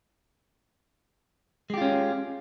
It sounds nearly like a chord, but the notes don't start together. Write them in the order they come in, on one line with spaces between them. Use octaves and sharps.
G#3 G4 F4 C#4